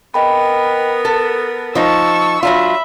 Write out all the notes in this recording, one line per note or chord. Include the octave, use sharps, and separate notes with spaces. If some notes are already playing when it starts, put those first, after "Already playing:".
B3 A#4 D#5 G5 B5
A4 A6
F3 D#4 A5 C#6 E6
F#3 D4 F4 E5 B5